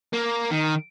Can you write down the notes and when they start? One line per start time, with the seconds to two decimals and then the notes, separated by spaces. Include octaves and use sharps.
0.13 A#3
0.51 D#3